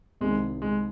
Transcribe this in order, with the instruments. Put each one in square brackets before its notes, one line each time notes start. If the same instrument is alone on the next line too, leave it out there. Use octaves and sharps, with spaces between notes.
[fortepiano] C2 C3 D#3 [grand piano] G#3
[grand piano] G#3